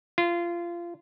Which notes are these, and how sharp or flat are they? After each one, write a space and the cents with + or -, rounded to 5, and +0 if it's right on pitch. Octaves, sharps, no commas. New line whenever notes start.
F4 -20